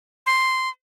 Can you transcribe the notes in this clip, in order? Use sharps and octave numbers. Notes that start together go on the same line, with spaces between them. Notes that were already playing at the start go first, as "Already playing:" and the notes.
C6